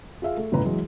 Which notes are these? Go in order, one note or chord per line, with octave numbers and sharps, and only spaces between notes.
F4 G#4 E5 F5
A3
G1 A2 C#3 B4 A#5
E3 F#3 G#3